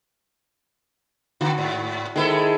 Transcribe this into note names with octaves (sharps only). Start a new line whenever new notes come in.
D3 F#4
G#2
D#3 G#3 E4 A4 C5 E5